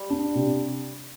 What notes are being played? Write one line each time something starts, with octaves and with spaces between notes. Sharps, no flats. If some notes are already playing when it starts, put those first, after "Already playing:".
Already playing: G3
D4
C3